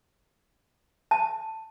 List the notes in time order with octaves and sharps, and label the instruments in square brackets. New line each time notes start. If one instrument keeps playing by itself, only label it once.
[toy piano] A5